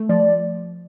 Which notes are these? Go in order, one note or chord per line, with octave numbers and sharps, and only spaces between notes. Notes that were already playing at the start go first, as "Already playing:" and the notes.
Already playing: A3
F3 D5